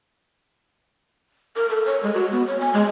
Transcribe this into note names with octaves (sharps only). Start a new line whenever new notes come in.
A#4
A4
C#5
G#3
F#4
B3
C#5
G#5
G#3